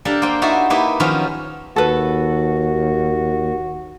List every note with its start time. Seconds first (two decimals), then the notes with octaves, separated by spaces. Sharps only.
0.05 D4 G4 A4 A#4 F5
0.22 A#3 C5 G5
0.42 D#4 E4 F#4 E5 A5
0.70 A#3 D#4 E4 G4 B4
1.00 D#3 F3 F#3 C#4 F4 B4
1.76 D#2 F#4 A4 B4